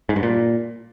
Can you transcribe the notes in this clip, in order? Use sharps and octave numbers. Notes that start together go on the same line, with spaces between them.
G#2
G2
A#2